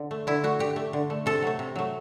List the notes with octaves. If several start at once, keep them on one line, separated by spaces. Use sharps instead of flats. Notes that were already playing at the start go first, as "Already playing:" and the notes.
Already playing: D3
A3
D3 E4
A3 F#4
D3 G4
A3
D3
A3
C3 A4
F#3 A3
C3
F#3 A3